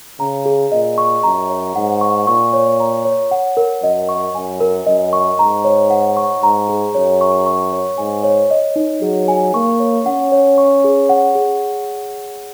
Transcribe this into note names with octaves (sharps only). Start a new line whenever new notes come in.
C#3 A#5
G#4
A#2 D#5
C#6
F#2 A#5
C#5
G#2 F#5
C#6
A#2 C#6
C#5
A#5
C#5
F#5
A#4
F#2 D#5
C#6
F#2 G#5
A#4
F#2 D#5
C#6
G#2 A#5
C#5
F#5
C#6
G#2 A#5
G#4
F#2 C#5
C#6
C#6
C#5
G#2 G#5
C#5
D#5
D#4
F#3 G#4
G#5
A#3 C#6
C#5
C#4 F#5
C#5
C#6
G#4
F#5
G#4